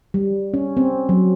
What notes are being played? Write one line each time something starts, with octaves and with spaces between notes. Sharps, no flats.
G3
C#4
C4
F#3